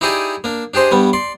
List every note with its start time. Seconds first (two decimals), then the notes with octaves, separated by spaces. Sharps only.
0.01 D#4 E4 G4 G#4 D5 D#5
0.44 A#3 D4
0.74 D4 G4 G#4 C5 D#5
0.92 G2 G3 B3
1.13 D5 C6